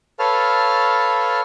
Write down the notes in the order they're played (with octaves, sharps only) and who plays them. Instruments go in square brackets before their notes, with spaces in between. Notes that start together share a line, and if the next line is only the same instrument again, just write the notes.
[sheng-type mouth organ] A4 B4 C#5 F5 A5 F6